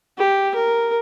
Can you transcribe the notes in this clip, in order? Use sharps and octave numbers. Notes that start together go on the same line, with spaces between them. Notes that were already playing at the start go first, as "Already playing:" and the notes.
G4
A#4